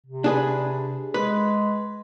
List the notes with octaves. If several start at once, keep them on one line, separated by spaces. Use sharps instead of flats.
C3
D4 G#4 B4
G#3 B4